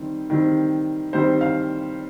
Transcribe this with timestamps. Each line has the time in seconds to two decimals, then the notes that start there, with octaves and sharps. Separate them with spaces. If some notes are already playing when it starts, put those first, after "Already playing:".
Already playing: D#3 G3 C4
0.30 D#3 G3 C4
1.13 D#3 G3 C4 C5
1.41 F5